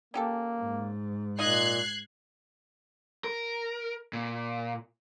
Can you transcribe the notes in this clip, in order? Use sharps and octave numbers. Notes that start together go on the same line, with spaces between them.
A#3 C#4 G4 A4
G#2
A#2 D#4 F4 D#5 F#6 G#6 C7
A#4
A#2